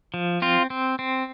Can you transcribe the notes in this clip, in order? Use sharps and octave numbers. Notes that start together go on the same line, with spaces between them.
F3
C4 F4
C4
C4